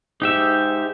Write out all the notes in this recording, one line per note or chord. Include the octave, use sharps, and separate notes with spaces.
G#2 D#4 G4 E5